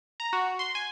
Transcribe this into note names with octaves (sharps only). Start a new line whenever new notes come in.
A#5
F#4
C6
G#5